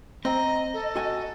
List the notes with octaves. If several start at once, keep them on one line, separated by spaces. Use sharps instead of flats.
C4 D#5 A#5
A4
F#4 G#5